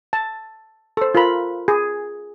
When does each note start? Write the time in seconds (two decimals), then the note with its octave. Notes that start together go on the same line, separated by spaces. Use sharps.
0.13 A5
0.97 A4 C5
1.15 F4 A#4 B5
1.68 G#4